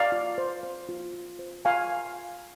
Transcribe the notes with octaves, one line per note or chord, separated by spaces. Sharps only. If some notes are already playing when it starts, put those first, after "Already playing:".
Already playing: D5 F5
F4
C5
C5
F4
F4
C5
F4 F5 G#5